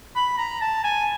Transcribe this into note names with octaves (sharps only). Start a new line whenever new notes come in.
B5
A#5
A5
G#5